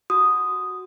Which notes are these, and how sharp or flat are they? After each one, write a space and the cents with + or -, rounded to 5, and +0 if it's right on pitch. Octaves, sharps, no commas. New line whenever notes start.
F#4 +0 D#6 +0